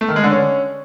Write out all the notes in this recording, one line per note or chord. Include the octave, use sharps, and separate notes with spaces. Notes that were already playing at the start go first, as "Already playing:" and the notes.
A3
D#3
G#3
D3
C#4